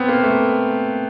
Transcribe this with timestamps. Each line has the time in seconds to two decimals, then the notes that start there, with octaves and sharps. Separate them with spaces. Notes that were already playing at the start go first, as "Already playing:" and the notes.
Already playing: B3 C4
0.09 A#3
0.23 A3